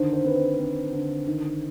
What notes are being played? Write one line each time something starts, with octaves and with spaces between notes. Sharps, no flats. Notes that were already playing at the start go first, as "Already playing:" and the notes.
Already playing: D3 D#3 C5
C5
C4 B4
C5
C4
D3
D#3